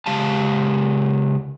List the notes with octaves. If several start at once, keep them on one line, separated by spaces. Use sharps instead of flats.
C#3 G#3 G4 F5 A5